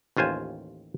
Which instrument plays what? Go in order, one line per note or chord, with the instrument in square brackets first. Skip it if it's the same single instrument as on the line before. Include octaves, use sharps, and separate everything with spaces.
[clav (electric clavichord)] A1 D#2 F4 C5 G#5